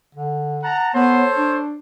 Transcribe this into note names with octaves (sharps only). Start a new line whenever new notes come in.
D3
F#5 A5 A#5
B3 A4 C5 C#5
D4